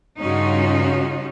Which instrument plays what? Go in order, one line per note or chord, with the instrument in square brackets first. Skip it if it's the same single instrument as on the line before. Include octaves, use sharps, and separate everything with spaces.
[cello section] G2 C#3 C#4 D#4 F4 F#4